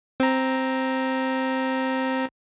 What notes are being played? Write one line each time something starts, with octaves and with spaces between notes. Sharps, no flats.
C4 A#5